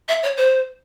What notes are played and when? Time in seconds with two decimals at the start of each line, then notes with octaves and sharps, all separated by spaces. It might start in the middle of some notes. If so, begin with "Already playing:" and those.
0.09 E5
0.23 C#5
0.37 C5